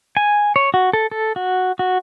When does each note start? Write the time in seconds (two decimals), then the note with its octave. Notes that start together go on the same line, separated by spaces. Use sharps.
0.17 G#5
0.56 C#5
0.74 F#4
0.93 A4
1.11 A4
1.36 F#4
1.79 F#4